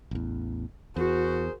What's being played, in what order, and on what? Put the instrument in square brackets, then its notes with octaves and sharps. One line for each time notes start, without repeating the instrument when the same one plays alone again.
[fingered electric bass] A1 E2
[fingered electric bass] E2 [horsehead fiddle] F#4 [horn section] G#4 A#4 C5